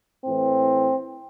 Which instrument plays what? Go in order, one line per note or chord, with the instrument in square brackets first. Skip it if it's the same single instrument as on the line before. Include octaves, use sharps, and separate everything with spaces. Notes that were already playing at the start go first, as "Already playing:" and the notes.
[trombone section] A2 E3 C4